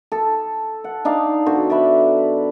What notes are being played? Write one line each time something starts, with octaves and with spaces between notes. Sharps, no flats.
A4
F#5
D4 D#4 F5
D3 B3 F#4 C5
D5 E5 B5